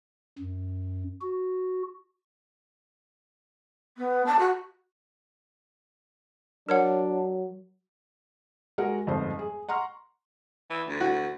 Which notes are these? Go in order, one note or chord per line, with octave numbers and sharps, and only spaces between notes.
F#2
F#4
B3
A5
F#4
F#3 D4 A#4 C#5 F#5
G#3 F#4 A#4 F#5
G1 F2 G#2 C5
G#4
F#5 A#5 C6 C#6 F6
E3
D2
F#4